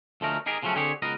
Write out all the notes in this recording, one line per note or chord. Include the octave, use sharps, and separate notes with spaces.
D2 F3 A3 C#4 D#4 A#4
D#4 G4 G#4 A#4
C#3 F3 F#3 A3 C#4
D3 C4 G4 G#4 C#5
C#2 B3 A#4 D#5